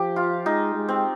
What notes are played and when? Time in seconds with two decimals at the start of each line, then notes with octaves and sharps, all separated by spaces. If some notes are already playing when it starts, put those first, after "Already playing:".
Already playing: F3 G4
0.16 F4
0.46 G#3 D#4
0.75 G#3
0.89 C4